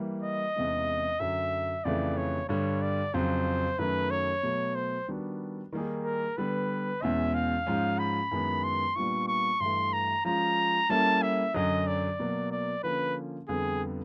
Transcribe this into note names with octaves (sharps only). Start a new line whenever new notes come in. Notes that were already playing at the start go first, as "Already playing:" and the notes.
Already playing: E3 G3 A#3
D#5
E2 C3 E3 G#3 C#4
F#2 D3 F#3 E5
F2 C#3 E3 A3 D5
C#5
G2 D3 G3 C#5
D5
F2 C#3 F#3 C5
F#2 D#3 F#3 A3 C#4 B4
C#5
B2 F#3 A3
C5
D#3 G3 B3 D4 F#4
D#3 G3 A#3 D#4 G#4
A#4
D3 G3 B3 B4
E2 B2 G#3 C#4 E5
F5
G#2 F3 G#3 C#4
B5
F#2 D#3 G#3 B3 E4
C6
A#2 G3 B3 D4 F4 C#6
C#6
G2 E3 A3 C6
A#5
F3 G#3 C#4 F4 A#5
G3 A#3 C#4 E4 A4 A5
E5
F#2 D3 F#3 D#5
D5
B2 F#3 A#3
D5
D3 F3 A#3 C#4 B4
F2 D3 G3 B3 G#4